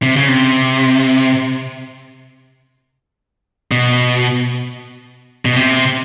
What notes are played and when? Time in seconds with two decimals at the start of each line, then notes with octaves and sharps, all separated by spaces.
0.03 C3
0.16 C#3
0.29 C3
3.71 B2
5.45 B2
5.56 C3